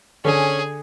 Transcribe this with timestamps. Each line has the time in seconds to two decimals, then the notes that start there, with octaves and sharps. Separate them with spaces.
0.25 D3 C#4 G#4